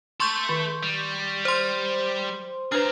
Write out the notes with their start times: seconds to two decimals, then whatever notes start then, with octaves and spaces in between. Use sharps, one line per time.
0.20 A3 A4 C6 C#6 G6
0.49 D#3
0.83 G3
1.45 C5 C6
2.72 D4 G#4 B4 C5 A#5 F6